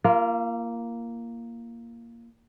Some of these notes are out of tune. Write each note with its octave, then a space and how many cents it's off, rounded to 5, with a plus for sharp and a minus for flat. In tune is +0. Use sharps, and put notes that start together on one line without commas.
A#3 +0 F4 -35